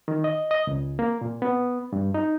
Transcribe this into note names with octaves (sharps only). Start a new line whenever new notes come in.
D#3
D#5
D#5
C#2
A#3
A#2
B3
G2
D#4